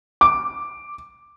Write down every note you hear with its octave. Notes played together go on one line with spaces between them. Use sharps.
D6